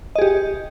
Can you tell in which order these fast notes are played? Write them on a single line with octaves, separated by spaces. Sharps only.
D#5 G#4 G4